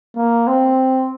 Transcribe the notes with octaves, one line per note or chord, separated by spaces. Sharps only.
A#3
C4